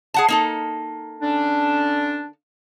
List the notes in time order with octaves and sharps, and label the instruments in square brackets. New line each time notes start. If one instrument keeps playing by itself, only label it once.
[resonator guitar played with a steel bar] G#4 F#5 A5
A#3 D#4 A4
[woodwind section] D3 C#4 D4